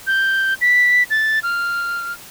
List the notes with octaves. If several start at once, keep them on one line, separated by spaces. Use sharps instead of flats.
G6
B6
A6
F6